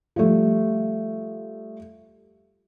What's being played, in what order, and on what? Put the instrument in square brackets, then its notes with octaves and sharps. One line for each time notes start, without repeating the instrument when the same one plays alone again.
[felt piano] F3 G3 A3